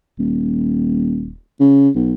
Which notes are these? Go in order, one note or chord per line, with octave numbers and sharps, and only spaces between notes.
D#1
C#3
B1